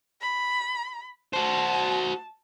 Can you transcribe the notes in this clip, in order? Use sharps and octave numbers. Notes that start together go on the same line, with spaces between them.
B5
F#4 C5 A5